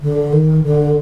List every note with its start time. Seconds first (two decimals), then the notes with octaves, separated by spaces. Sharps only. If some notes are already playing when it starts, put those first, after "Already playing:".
0.02 D3
0.33 D#3
0.64 D3